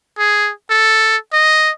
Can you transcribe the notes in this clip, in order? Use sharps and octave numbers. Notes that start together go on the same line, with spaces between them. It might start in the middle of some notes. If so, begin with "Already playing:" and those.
G#4
A4
D#5